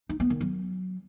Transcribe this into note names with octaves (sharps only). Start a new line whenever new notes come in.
D#4
B3
D#3
F#3